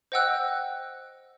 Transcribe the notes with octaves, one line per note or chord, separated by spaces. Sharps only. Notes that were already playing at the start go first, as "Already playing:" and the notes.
C5 D#5 F#5 G5 E6 F#6